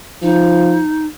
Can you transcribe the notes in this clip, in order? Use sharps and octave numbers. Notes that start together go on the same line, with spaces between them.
F3 D#4